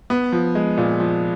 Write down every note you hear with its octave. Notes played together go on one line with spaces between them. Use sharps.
B3
F3
G#3
A#2
F3